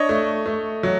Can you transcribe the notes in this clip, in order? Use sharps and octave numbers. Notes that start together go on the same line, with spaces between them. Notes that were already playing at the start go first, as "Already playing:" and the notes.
Already playing: D4 C#5 D#5
A3
A3
F#3